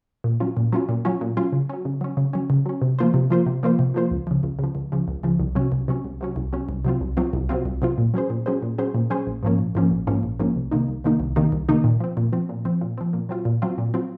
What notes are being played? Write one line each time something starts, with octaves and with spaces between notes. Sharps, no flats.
A#2
F#3 C#4 F4
A#2
F#3 C#4 F4
A#2
F#3 C#4 F4
A#2
F#3 C#4 F4
C#3
F#3 C#4
C#3
F#3 C#4
C#3
F#3 C#4
C#3
F#3 C#4
C3
F3 A#3 F4 C5
C3
F3 A#3 F4 C5
C3
F3 A#3 F4 C5
C3
F3 A#3 F4 C5
C#2
C#3 F3
C#2
C#3 F3
C#2
C#3 F3
C#2
C#3 F3
C2
C3 F#3 C#4
C2
C3 F#3 C#4
C2
C3 F#3 C#4
C2
C3 F#3 C#4
C2
C3 F#3 C4 F4
C2
C3 F#3 C4 F4
C2
C3 F#3 C4 F4
C2
C3 F#3 C4 F4
A#2
F#3 C#4 G#4 C5
A#2
F#3 C#4 G#4 C5
A#2
F#3 C#4 G#4 C5
A#2
F#3 C#4 G#4 C5
A#1
G#2 F3 A#3 C#4
A#1
G#2 F3 A#3 C#4
A#1
G#2 F3 A#3 C#4
A#1
G#2 F3 A#3 C#4
C2
C3 D#3 A#3 D#4
C2
C3 D#3 A#3 D#4
C2
C3 D#3 A#3 D#4
C2
C3 D#3 A#3 D#4
A#2
F3 C4
A#2
F3 C4
A#2
F3 C4
A#2
F3 C4
A#2
F#3 C4 F4
A#2
F#3 C4 F4
A#2
F#3 C4 F4